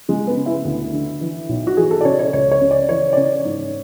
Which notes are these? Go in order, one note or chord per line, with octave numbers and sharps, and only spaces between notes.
C#3 G#3
B3
C#3
E4
D2
D3
E3
B1
F#4
E3 G#4
A4
D5
C#3 C#5
C#5
C#2 C#5
C#5
C#3
D5
E3 C#5
D5
C#3 C#5
G#2